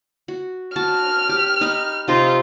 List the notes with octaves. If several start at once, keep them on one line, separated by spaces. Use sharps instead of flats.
F#4
F#4 A5 F6
G4
D#4 D#5 B5
C3 D#4 F4 A#5